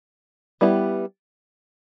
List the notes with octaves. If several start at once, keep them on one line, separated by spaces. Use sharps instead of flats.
G3 B3 E4 G4